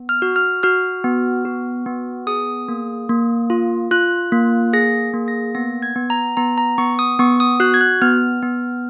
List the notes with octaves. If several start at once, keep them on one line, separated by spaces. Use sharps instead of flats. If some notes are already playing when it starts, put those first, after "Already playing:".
Already playing: B3
F6
F#4
F6
F#4 F6
B3
F#4
B3
G#4 D#6
A#3
A#3
F4
F4 F#6
A#3
G#4 A#6
A#3
A#6
B3 A#6
G#6
B3
A#5
B3 A#5
A#5
B3 C#6
D#6
B3 C#6
D#6
F#4 F#6
G#6
F#6
B3 F6
B3